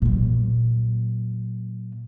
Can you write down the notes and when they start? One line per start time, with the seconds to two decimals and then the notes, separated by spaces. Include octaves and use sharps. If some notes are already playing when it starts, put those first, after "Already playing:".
0.02 A#2 F#3